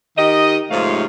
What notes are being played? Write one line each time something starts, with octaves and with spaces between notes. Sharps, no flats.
D#3 D#4 G4 D#5
G#2 C3 F3 A3 C#5 F5